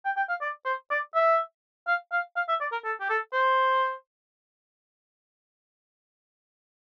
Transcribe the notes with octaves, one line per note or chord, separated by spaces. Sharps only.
G5
G5
F5
D5
C5
D5
E5
F5
F5
F5
E5
D5
A#4
A4
G4
A4
C5